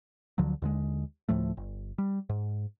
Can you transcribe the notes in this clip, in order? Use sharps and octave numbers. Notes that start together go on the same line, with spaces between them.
D2 D3 F3 F#3
D#2 D3 G#3
D2 A2 F3 A3
G1
G3
G#2